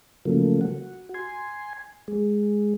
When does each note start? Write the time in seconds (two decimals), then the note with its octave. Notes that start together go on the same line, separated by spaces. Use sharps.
0.25 C#3 F3 F#3 A3 A#3
0.61 F#4
1.14 G#5 C6
2.08 G#3